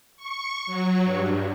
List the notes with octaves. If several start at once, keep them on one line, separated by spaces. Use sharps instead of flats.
C#6
F#3
G2